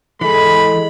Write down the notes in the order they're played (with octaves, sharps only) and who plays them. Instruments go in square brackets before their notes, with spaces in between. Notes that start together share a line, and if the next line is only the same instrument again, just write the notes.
[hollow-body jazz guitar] E3 [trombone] G#3 [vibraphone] A4 [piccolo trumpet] B5